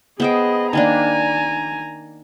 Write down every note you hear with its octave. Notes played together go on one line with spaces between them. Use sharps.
B3 G#4 C5 D#5 G5
D#3 A#3 D4 G#5 A#5